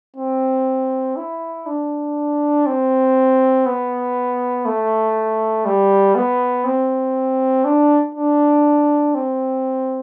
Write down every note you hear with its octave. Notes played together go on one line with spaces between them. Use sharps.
C4
E4
D4
C4
B3
A3
G3
B3
C4
D4
D4
C4